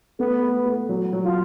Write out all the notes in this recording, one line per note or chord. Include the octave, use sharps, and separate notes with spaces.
A3 B3
A3
A3
F#3
F#3
F4